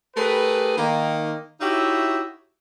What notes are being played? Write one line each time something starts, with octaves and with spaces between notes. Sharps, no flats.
A3 G4 G#4 A#4 B4
D#3 A#3
D#4 E4 F#4 G4 C#5 E5